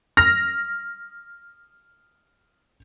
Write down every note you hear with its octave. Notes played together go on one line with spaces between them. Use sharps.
F6 A#6